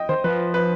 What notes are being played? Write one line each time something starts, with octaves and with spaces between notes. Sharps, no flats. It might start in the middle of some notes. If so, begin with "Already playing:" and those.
Already playing: D#5 G5
D#3 C5
F3 B4
B4